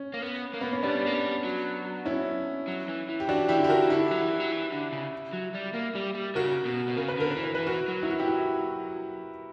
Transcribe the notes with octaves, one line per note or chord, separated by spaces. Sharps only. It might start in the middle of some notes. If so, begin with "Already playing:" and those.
Already playing: C#4
A#3
B3
A#3
B3
C#4
G3 B3 D4
A#3
G3
F#3
C#4 E4
F#3
E3
E3
G4
E3 D4 F#4
E3 E4 G4
D3
G4
F#4 A#4
E3
D3 E4 G4
F#3
E3
F#3
E3
D3
C#3
F#3
G3
A#3
G3
G3
C#3 F#4 A#4
B2
B2
C#3 A#4
B4
D3 A#4
B4
E3
A#4
E3 B4
F#4 A#4
F#3
E4
F#4
E4 G4